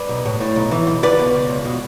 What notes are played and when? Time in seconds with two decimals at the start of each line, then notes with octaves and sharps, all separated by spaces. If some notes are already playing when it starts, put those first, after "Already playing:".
Already playing: B4 D5
0.09 B1
0.26 A2
0.40 A2
0.56 B1
0.71 E3
0.87 B1
1.03 C#2 B4 D5
1.19 B2
1.35 C#2
1.50 C#2
1.65 B2